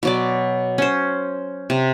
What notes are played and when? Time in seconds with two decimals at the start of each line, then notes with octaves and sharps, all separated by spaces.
0.03 B2 F#3 D5
0.78 C#4 C5
1.70 C3